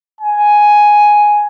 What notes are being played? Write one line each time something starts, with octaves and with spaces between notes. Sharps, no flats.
G#5